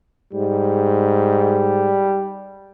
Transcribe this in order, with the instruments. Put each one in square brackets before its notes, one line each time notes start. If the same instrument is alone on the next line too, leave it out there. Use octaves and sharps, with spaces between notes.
[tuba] G#2 [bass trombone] G3